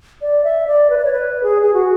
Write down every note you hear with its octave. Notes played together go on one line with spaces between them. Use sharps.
D5
E5
D5
B4
D5
C#5
B4
G#4
G#4
F#4